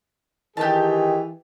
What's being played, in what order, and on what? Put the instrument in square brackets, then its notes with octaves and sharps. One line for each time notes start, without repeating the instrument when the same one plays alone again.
[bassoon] D#3 [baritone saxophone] E3 [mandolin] G4 A5 [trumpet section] G#4